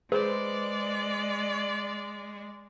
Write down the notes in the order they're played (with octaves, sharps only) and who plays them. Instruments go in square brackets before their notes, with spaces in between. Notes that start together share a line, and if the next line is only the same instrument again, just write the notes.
[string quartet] G#3 [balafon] G#4 [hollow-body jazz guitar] B4 C5 [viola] D5